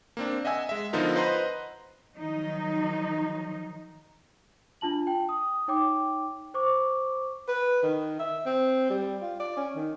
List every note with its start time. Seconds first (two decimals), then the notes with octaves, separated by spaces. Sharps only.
0.17 A#3 C4 D4
0.45 D#5 E5 F#5 G#5 E6
0.69 G#3 E5
0.93 D3 F3 B3 D#4 F4 A#4
1.16 B4 C5 D#5 F#5 A#5 C6
2.15 D#3 F3 F#3 D#4
4.81 D4 F4 A5 F#7
5.07 G5
5.29 D#6
5.68 D#4 C#5 G5 D6
6.54 C5 C#6 D6
7.48 B4
7.83 D#3
8.20 E5
8.46 C4
8.90 G3
9.22 F4
9.40 D5
9.57 C#4
9.76 D#3